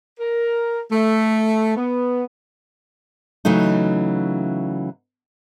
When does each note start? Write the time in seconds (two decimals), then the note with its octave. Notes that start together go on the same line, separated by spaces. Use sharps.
0.20 A#4
0.91 A3
1.76 B3
3.45 C#3 E3 F#3 A3 D#4